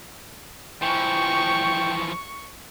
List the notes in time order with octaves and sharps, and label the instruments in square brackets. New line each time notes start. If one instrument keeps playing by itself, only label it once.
[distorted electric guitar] E3 F3 [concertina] G5 [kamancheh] C#6